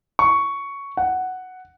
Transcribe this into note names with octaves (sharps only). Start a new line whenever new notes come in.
C#6
F#5